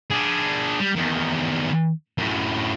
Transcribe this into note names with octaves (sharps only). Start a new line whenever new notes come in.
D4 G#4
G3
E2 D#3
F#2 A2